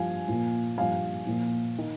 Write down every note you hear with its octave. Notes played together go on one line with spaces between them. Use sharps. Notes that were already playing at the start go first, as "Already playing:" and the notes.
Already playing: G2 F3 F5 G#5
A#2 F3
G2 F3 F5 G#5
A#2 F3
D#3